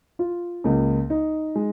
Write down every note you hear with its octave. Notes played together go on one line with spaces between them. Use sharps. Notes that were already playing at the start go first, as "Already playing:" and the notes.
F4
C#2 C#3 A#3
D#4
G#3